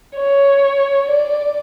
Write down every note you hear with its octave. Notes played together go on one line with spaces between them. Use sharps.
C#5
D5